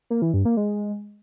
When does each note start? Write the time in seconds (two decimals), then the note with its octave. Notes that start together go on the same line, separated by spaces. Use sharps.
0.10 A#3
0.22 E3
0.34 G2
0.45 A#3
0.57 G#3